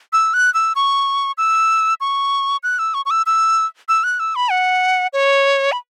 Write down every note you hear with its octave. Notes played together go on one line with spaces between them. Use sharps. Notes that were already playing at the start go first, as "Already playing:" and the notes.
E6
F#6
E6
C#6
E6
C#6
F#6
E6
C#6
C#6
E6
E6
E6
F#6
E6
B5
F#5
C#5
B5